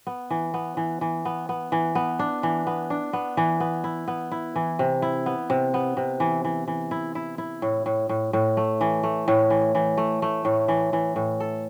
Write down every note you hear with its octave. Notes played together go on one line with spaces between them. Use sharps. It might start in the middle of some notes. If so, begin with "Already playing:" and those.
B3
E3
B3
E3
E3
B3
B3
E3
B3
D4
E3
B3
D4
B3
E3
B3
E4
B3
E4
E3
C3
E4
B3
C3
B3
C3
E3
E3
E3
E4
E4
E4
A2
A2
A2
A2
A3
E3
A3
A2
E3
E3
A3
A3
A2
E3
E3
A2
A4